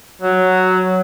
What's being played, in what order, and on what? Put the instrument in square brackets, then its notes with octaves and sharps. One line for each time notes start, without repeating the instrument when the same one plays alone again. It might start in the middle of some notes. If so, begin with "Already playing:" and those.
[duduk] F#3